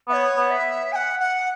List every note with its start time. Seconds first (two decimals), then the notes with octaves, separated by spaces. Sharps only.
0.08 B3 E5
0.13 C#5
0.37 B3
0.50 E5
0.92 G#5
0.95 F#5
1.20 F#5